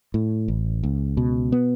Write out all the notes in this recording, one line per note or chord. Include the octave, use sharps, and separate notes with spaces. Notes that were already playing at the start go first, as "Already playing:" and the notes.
A2
A1
C#2
B2
B3